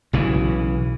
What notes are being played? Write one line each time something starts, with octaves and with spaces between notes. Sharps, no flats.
B1 C#3 E3